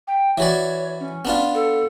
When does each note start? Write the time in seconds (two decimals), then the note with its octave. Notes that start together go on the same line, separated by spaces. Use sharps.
0.07 G5
0.38 E3 F#4 C#5 D5
1.00 C#4
1.25 B3 D4 F4
1.55 A4